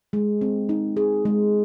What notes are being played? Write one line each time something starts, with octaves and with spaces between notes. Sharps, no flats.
G#3
C4
D#4
G#4
G#3